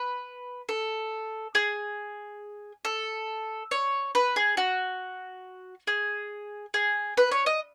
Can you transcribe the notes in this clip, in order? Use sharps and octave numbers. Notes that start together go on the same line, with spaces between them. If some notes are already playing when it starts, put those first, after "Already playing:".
Already playing: B4
A4
G#4
A4
C#5
B4
G#4
F#4
G#4
G#4
B4
C#5
D#5